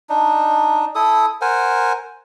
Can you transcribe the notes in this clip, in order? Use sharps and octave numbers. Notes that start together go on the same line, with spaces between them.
D4 D#4
E4 A4 D#6
A#4 C5 F#5 G#5